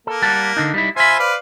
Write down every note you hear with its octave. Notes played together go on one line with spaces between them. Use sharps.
A#3 A4
G3 F#5 A5
D3 D4 D#4
G3 D#4 E4
F4 C5 E5 G#5 B5
B4 D5 F5